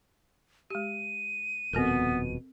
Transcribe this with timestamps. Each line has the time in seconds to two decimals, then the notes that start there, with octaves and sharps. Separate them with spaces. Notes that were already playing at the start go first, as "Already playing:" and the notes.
0.70 G#3 G4 D#7
1.73 D#1 F2 B2 B3 C4 A4 A#4